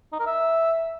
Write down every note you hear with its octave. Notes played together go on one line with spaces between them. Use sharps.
D#4
A#4
E5